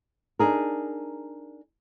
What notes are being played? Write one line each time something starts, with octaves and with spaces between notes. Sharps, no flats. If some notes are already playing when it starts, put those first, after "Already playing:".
D4 D#4 G#4 A#4